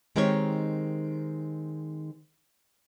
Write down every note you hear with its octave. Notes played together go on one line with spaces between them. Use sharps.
D#3 G#3 C4 D#4 G4 C#5